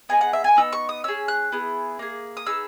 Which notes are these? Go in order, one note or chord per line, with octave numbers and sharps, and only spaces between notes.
B3 D#4 G#4 G#5
F#5
E5
G#5
B3 D#4 E6
C#6
D#6
C#4 G#4 E6
F#6
B3 E4 G#4
A#3 E4 G#4
D#6
B3 D#4 G#4 E6